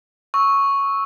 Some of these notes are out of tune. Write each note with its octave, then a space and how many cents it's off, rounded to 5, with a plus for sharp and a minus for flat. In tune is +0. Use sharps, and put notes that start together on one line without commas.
C#6 +0 E6 -15